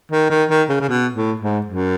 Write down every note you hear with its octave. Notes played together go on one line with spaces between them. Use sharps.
D#3
D#3
D#3
C#3
C#3
B2
A2
G#2
F#2